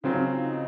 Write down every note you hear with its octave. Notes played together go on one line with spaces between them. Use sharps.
C#3 F#3 C4 D#4 F4
C#4
D#4